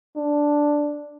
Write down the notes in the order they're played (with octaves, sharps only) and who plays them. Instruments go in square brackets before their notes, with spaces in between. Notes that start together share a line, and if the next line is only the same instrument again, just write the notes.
[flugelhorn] D4